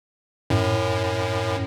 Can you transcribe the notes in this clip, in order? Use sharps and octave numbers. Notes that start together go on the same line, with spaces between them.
F#2 A2